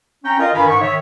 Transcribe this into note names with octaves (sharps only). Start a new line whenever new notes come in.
C#4 G5 A#5
F4 A#4 D#5
G2 D#3 A#4 F5 G#5 B5
G#2 C#6
D#3 C#5 E5